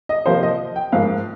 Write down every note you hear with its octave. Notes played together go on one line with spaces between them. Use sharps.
D#5
C3 F3 A#3 C5
D#5
G5
G#2 F3 A#3 F5